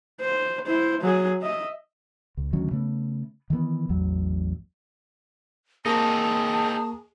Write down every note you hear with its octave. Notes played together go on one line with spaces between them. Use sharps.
C5
E4 C5
F#3 G#4
D#5 E5
C#2
D2 D#3 F#3 C#4
C#3 A3 B3
D#3 E3 G#3 B3
A1 E2 F#3
A#3 C4 D#4 G#4 A5 A#5 C#6